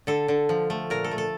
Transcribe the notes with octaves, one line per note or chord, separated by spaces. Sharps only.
D3 A4
D3
F3
A3
A#2 A#4
A4
A3
A4